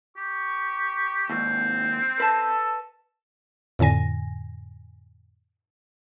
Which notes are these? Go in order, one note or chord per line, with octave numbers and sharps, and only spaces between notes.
G4 C#6
D#2 G#2 C4
A4 B4 A5
F2 A2 D3 G#5 A#6